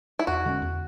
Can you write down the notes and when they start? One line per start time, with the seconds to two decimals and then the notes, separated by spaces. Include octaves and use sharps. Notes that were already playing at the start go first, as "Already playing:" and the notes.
0.19 E4
0.27 E2 F#4
0.45 D3 G#3 C#4
0.62 E2